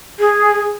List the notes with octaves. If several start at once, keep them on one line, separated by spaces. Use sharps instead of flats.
G#4